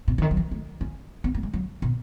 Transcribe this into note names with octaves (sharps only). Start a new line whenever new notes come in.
B2
C#3
D#3
F#3
E3
A3
C#4
B3
A3
G#3
F#3
B2